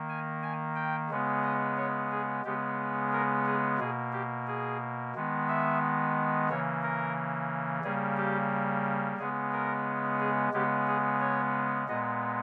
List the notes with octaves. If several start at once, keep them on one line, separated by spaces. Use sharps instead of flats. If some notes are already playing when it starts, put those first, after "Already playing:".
Already playing: D#3 A#3
G#5
G#5
G5
C#3 G#3 B3
D#5
C#5
G#4
C#3 G#3 B3 G4
A#4
G#4
B2 A#3 G#4
G4
G#4
D#3 G#3 B3
E5
C#3 E3 A#3 C#5
A#4
C#3 G3 A#3 G#4
G4
C#3 G#3 B3 G#4
A#4
G#4
C#3 G#3 B3 G4
G#4
C#5
A#2 G#3 B3 D#5